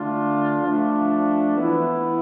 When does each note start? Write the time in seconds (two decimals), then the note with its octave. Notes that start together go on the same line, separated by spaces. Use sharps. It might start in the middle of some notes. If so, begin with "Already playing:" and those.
Already playing: D3 A3 D4 F4
0.62 F3 A3 D4
1.56 E3 B3 E4